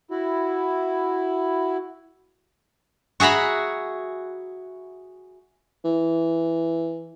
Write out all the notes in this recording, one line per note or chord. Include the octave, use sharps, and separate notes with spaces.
E4 F#4
F#4 G#4 E5 A#5 B5
E3